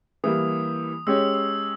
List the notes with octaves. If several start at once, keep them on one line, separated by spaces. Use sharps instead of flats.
E3 G3 A#3 D#6
G#3 C#4 G4 C#5 E6
E6